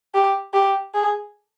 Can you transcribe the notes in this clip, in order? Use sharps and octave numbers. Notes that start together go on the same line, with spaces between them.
G4
G4
G#4